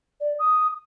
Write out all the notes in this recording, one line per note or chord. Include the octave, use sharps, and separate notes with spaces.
D5
D#6